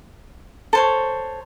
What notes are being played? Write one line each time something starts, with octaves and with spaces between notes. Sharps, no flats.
A4 C5 C#5